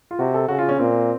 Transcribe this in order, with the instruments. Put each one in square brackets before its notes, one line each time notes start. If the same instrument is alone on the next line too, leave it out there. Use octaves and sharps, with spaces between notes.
[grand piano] F4
[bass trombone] C3 [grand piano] F#4
[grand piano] A4
[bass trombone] C#3 [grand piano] F#4
[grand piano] F4
C#4
[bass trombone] A#2 [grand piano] C4